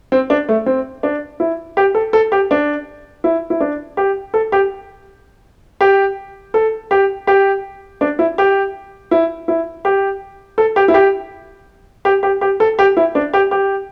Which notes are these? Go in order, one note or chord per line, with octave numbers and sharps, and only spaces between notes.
C4
D4
A3
C4
D4
E4
G4
A4
A4
G4
D4
E4
E4
D4
G4
A4
G4
G4
A4
G4
G4
D4
E4
G4
E4
E4
G4
A4
G4
E4
G4
G4
G4
G4
A4
G4
E4
D4
G4
G4